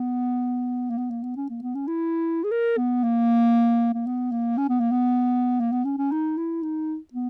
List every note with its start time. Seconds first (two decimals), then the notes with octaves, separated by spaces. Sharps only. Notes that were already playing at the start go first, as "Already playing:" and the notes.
Already playing: B3
0.90 A#3
0.98 B3
1.10 A#3
1.23 B3
1.36 C#4
1.50 A#3
1.62 B3
1.75 C#4
1.87 E4
2.44 G#4
2.51 A#4
2.77 B3
3.03 A#3
3.94 A#3
4.06 B3
4.31 A#3
4.57 C#4
4.69 B3
4.80 A#3
4.91 B3
5.60 A#3
5.72 B3
5.85 C#4
5.98 C#4
6.11 D#4
6.37 E4
6.62 D#4
7.13 B3